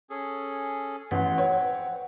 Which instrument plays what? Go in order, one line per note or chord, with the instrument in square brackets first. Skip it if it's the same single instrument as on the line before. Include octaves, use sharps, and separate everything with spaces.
[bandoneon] C#4 G#4 A4
[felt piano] A1 [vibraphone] B4 [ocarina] F#5 [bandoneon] C6
[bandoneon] F2 C4 [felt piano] C#5